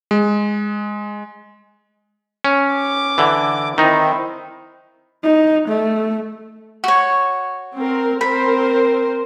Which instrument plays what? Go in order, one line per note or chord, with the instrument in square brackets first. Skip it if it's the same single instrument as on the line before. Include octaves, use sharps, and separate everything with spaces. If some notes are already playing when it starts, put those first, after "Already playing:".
[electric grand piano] G#3
[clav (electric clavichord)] C#4
[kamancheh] D6
[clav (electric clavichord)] D3 E3
[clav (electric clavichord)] D#3 D#4 [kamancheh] C4 E4
[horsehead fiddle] D#4
A3
[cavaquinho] F#4 C#5
[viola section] C4 A#4
[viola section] C4 A#4 C5 [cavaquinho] B5